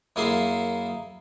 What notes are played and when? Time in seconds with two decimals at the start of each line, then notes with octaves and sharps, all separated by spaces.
0.16 F#2 A#3 E4 G#4 E5 C6